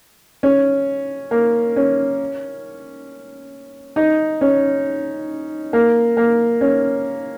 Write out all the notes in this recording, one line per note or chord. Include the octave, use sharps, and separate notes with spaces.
C#4
A#3
C#4
D#4
C#4
A#3
A#3
C#4